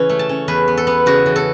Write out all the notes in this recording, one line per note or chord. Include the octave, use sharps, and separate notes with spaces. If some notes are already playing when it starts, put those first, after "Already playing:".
Already playing: C#3 E3 C#4
A3
A5
C#4
E2 B4
B3
A4
B3
C#3 F#4
E3
A4